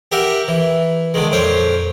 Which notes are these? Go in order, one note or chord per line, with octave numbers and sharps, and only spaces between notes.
G4 A#4 E5 F#5
E3
D3 D#3 G#3
F2 A#2 C5 C#5